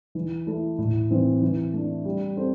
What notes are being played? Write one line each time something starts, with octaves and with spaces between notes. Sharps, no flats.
E3
A3 E4 A4
A2
E3 C4
E3
A3 D4
G3
C4 A4 C5